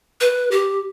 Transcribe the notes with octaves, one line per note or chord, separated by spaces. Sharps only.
B4
G4